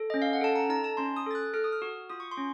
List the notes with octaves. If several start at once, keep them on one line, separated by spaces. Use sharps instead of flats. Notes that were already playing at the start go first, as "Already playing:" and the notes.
Already playing: A4
C#4 D#5
F5
F#5
A4 A5
A#5
D#4 A#5
A5
C#4 C6
D#6
A4 A6
F#6
A4 F6
D#6
F6
F#4
F4 D#6
C#6
C6
C#4